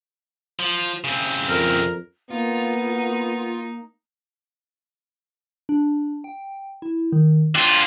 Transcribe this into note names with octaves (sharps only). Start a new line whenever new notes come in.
F3
C#3 C4
F2 A#4
A#3 B3 D#4 F4
D4
G5
E4
D#3
D3 F4 G5